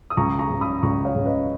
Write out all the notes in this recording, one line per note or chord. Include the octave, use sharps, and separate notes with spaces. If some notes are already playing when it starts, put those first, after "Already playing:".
D#6
C#2 A#5 C#6
A#5 C#6
C#3
B5 D#6
C#2 A#5 C#6
C#5 F5
C#3
B4 D#5